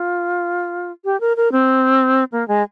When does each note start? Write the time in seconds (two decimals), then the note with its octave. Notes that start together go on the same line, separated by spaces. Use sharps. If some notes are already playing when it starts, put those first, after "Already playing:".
Already playing: F4
1.05 G4
1.20 A#4
1.37 A#4
1.52 C4
2.32 A#3
2.48 G#3